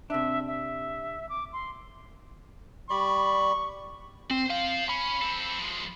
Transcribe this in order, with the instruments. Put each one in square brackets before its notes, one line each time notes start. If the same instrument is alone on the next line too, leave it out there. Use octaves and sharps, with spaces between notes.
[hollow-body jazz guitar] C3 D4 [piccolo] E5
[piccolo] E5
D6
C6
[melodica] G3 D5 B5 [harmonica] C#6
[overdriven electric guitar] C4 [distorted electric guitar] C5
[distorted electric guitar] F4 C5 [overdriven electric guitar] F5
[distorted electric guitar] C#4 [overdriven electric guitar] B5
[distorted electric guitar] C4 A4
F3 G#3